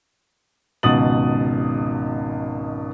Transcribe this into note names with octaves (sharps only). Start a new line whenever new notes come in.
G#1 C#2 B2 D#6 A6 F#7